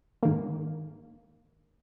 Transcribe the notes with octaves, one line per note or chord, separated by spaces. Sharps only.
G#2 D#3 A#3